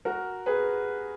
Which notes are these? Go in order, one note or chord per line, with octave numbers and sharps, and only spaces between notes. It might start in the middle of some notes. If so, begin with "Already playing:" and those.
F#4 A#4
G#4 B4